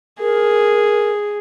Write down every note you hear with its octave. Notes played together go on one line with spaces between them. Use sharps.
G#4 A#4